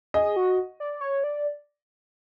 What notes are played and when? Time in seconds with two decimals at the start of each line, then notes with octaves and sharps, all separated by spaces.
0.14 G#4 D#5
0.36 F#4
0.80 D5
1.01 C#5
1.24 D5